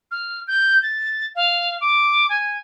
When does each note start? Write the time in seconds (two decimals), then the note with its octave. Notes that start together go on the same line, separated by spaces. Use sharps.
0.11 F6
0.48 G6
0.83 A6
1.35 F5
1.81 D6
2.29 G#5